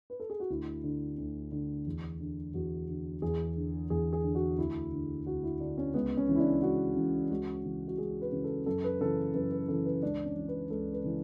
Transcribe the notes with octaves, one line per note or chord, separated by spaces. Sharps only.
B4
A4
G#4
F#4
D2 E4
D3
D2
D3
E2
D3
E2 F#4
D3
E2 G#4
D3
E2 G#4
G#4
D3
F#4
D2 E4
D3
D2 F#4
E4
D3 D4
C#4
C#2 B3
C#4
C#3 E3
E4
D4
C#2 F#4
C#3 E3
C#2 F#4
C#3 E3
F#4
C#2 G#4
B4
C#3 E3
A4
F#2 A4
B4
C#3 E3 A4
F#2 B4
B4
C#3 E3 A4
B4
C#2 D4
C#4
C#3 E3
B4
C#2 A4
B4
C#3 E3